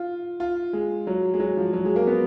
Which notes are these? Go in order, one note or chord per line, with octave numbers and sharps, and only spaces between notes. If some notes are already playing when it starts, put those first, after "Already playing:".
Already playing: F4
F4
G#3
F#3
G#3
F#3
F3
F#3
G#3
A#3
B3